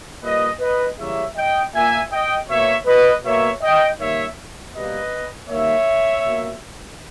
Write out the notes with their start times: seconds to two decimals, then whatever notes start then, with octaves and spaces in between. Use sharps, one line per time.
0.22 A#2 G3 A#3 B4 D#5
0.60 B4 D#5
0.97 C#3 E3 G3 A#3 C#5 E5
1.36 D#5 G5
1.74 A#2 A#3 E5 G#5
2.11 D#5 G5
2.48 B2 A#3 C#5 E5
2.86 B4 D#5
3.23 B2 A#3 C#5 E5
3.62 D#5 G5
3.99 D#3 G3 A#3 C#5 E5
4.74 B2 G3 A#3 B4 D#5
5.50 D#3 G3 A#3 C#5 E5
6.26 B2 A#3